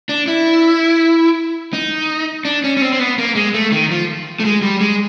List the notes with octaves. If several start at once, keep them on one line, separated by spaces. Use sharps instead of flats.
D4
E4
D#4
D4
C#4
C#4
C4
C4
B3
A#3
G#3
A3
D#3
F3
A3
G#3
G3
G#3